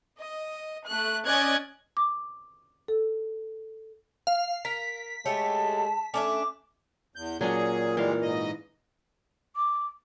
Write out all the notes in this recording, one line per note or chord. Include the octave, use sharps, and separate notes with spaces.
D#5
A3 F#6
C#4 D5 D#5 F#6 G#6
D6
A4
F5
A#4 B6
G#3 A3 G4 C#5 A5
A3 C#4 D4 E5 D6
E2 G6
A#2 F#3 C#4 D4 G#4
E3 G3 G#3 F5
G#2 D#5
D6